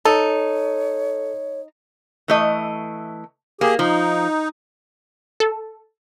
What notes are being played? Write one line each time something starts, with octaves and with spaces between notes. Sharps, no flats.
D#4 A4 C#5
E3 A3 D#5
A#3 G4 G#4
F3 D#4
A4